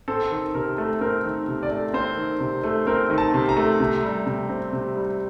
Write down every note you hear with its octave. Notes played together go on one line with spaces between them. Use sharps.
C4 A4
D#3
C3 A#4
A3
C4 A#4
D#3
C3
D5
A3
C4 C5
D#3
C3
A3
C4 A#4
D#3
A5
C3
A#5
A3
C3
G3
C3
C4
C3
G3